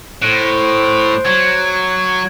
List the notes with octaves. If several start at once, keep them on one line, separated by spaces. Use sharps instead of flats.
A2 C5 F#6 D7
F#3 G#6